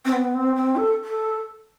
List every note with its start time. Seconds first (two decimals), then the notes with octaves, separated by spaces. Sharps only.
0.05 C4
0.12 B3
0.34 C4
0.55 C4
0.76 A4
1.04 A4